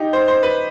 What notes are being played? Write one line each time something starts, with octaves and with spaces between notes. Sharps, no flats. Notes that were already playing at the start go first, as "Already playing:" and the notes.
Already playing: D#4 G4
C5
C5
B4